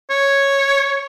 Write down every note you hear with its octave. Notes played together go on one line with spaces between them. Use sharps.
C#5